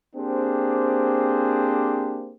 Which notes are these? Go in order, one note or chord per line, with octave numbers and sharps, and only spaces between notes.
A#3 C4 D4 G4 G#4 C5